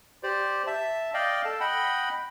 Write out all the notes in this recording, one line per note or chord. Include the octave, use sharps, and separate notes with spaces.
G4 C5 D5
E5 A5
D5 D#5 F5 G5
A4 A5
D#5 F#5 G5 B5